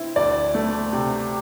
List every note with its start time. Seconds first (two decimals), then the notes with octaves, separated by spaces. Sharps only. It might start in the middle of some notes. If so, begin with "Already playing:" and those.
Already playing: C4 E4
0.16 D2 D5
0.54 A3
0.92 C3